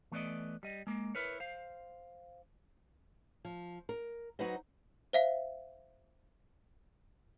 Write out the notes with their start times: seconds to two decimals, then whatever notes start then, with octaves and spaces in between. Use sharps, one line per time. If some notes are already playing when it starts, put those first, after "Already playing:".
0.12 E3 A3 B3 C5 D5 D#5
0.63 G3 D#5
0.87 G#3 A#3
1.15 E4 A#4 B4 C#5
1.40 C5 F5
3.45 F3
3.89 A#4
4.39 F#3 D#4 F#4 B4 C5 D#5
5.13 C5 E5 F5